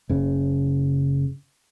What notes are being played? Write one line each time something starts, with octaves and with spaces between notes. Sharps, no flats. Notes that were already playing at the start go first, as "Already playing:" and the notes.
F#1 C#3